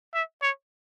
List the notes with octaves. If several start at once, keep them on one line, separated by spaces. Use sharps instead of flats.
E5
C#5